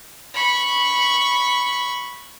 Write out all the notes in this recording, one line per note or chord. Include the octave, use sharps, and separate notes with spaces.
B5 C#6